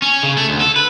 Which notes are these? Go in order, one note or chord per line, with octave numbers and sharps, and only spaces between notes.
C#4
C#3
A3
D2
A4
B4